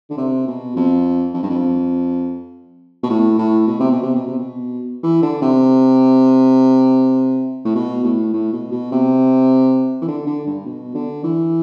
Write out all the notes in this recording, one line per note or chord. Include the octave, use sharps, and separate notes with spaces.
D3
C3
B2
F2
F2
G2
F2
B2
A2
A2
B2
C3
B2
C3
B2
C3
B2
E3
D3
C3
A2
B2
A2
A2
B2
B2
C3
E3
D3
D3
G2
B2
D3
E3